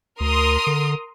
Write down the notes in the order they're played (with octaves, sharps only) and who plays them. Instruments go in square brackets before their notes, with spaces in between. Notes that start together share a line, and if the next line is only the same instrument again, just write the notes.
[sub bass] D2 [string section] A#4 C6 D#6
[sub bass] D3